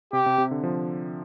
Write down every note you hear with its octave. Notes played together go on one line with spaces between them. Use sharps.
C3 G4
C3
C3
D3
F3